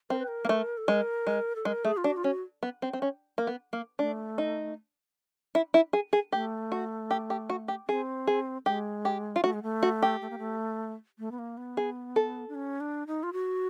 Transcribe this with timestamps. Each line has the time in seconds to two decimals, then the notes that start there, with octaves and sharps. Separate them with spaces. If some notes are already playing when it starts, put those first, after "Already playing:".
0.10 C4 A#4
0.19 B4
0.28 A#4
0.45 A#3
0.49 A3
0.78 A4
0.88 G#3 A#4
1.27 G#3
1.56 A4
1.65 G#3 A#4
1.85 A3 G#4
1.97 F4
2.04 D4 F#4
2.17 F4
2.24 C#4 F#4
2.63 B3
2.82 C4
2.93 C4
3.02 C#4
3.38 A#3
3.47 B3
3.73 A#3
3.99 A3 D4
4.38 D#4
5.55 E4
5.74 E4
5.93 G#4
6.13 G#4
6.32 A3 G4
6.72 F#4
7.11 G4
7.30 G4
7.50 F#4
7.68 G4
7.88 C4 G#4
8.27 G#4
8.66 G#3 G4
9.05 G4
9.36 F4
9.44 A3 F#4
9.53 G#3
9.63 A3
9.83 F#4
10.02 G4
10.22 A3
10.30 A#3
10.39 A3
11.19 A3
11.32 B3
11.39 A#3
11.57 B3
11.77 G#4
12.16 A4
12.49 D4
12.55 C#4
12.80 D4
13.07 D#4
13.23 F4
13.33 F#4